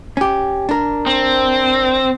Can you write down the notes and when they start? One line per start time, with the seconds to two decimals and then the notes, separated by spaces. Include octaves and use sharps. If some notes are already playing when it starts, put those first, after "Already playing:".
0.17 C#4 G4
0.69 D4 A#4
1.06 C4